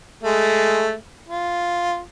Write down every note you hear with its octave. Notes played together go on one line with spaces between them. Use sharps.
G#3 A3
F4